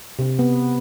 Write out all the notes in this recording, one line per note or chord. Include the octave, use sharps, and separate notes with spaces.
C3
B3